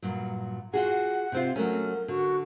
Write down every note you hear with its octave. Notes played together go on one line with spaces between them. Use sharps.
G2 A#2 F#3
F4 F#4 G#4 F#5
C3 C4 F4
F#3 A3 C#4 A#4
D3 F#4